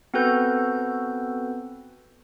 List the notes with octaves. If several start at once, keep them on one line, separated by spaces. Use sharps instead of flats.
B3 C4 F#4 A4 B4 G6